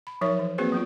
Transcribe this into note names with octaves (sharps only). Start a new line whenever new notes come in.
B5
F3 F#3 D#4 A#4 C#5 E5
E3
A#3 C4 F#4 G#4 B4 C5
F#3 B3 F4